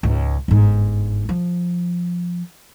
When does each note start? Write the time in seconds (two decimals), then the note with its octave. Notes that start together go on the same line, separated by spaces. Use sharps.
0.03 C#2 G#2
0.48 G1 G#2
1.29 F3